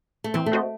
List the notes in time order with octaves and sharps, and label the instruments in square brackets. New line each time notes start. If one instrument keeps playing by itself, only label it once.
[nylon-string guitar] A3
[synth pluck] E3 [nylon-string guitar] C4
[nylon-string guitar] A3
[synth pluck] C4 F#4 C5 D#5